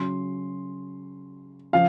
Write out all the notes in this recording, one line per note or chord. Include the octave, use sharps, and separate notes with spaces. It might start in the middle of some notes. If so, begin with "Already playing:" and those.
Already playing: C#3 F#3 C6
C#3 F3 F5